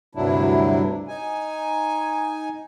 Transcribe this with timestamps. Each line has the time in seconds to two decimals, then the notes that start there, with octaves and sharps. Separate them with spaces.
0.15 D2 G2 C3 F#3 D4 E4
1.08 D#4 G#5